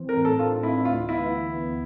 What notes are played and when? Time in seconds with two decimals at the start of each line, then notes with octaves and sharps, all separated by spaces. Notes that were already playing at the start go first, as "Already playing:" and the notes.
Already playing: E3 C4
0.09 A#4
0.17 A2
0.25 A4
0.39 D4 F4
0.63 E3 E4
0.85 D2 F4
1.09 B3 E4
1.32 B3
1.55 B3